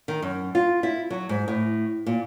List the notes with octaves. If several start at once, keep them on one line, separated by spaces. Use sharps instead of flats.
D#3
F#2
F4
E4
F#3
G#2
A2
A#2